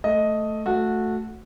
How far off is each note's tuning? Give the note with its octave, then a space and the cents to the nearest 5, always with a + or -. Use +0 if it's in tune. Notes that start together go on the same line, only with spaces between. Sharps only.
A3 +0 D#5 +5
A3 +0 F#4 -15